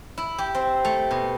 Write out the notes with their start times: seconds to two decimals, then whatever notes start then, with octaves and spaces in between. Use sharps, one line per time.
0.18 E4
0.38 G4
0.55 C4
0.85 A3
1.11 B2